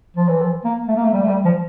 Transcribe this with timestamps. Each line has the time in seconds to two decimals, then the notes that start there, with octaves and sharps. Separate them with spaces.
0.16 F3
0.28 E3
0.42 F3
0.65 A#3
0.88 A3
0.96 A#3
1.04 A3
1.13 G3
1.22 A3
1.28 G3
1.45 F3